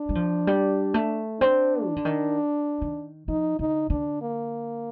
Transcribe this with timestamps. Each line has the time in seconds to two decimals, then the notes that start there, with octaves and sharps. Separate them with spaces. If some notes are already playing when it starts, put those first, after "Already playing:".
Already playing: D4
0.09 G3
0.15 F3
0.47 G3
0.94 A3
1.40 C4 D4
1.88 D#3
1.96 D3
2.05 D#3
2.81 D#3
3.28 F3 D#4
3.59 D3 D#4
3.90 D3 D4
4.22 A#3